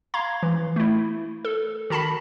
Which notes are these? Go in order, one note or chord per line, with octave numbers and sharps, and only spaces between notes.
F5 A#5 C6 G#6
E3
A3 E4
A4
D#3 F#4 A5 B5 B6